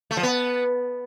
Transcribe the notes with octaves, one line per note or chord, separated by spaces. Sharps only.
A3
F3
B3